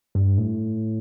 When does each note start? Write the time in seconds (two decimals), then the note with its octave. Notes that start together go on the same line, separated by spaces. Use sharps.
0.15 G2
0.38 A2